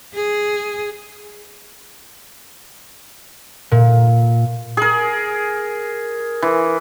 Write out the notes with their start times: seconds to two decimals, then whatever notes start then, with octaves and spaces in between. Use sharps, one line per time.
0.14 G#4
3.71 A#2
4.77 G#4 A#4
6.42 E3